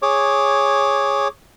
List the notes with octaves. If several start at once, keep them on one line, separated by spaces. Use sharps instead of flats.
G#4 C#5 D6